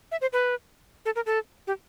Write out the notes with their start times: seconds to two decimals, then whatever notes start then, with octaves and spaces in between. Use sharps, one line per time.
0.12 E5
0.21 C5
0.33 B4
1.05 A4
1.16 A#4
1.26 A4
1.67 G4